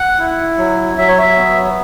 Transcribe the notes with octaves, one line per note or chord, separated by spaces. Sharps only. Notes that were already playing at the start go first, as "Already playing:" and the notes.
Already playing: F#5
E4
F#3
F#3 E5
C#5
E5
B3